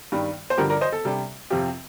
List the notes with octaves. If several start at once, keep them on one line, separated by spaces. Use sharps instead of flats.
G2 D#3 G3
C5
G2 D3 F3 G4 A#4
A#4 D5
C5 D#5
A4
C3 G3 D4
F2 C3 F3 C4 F4 G4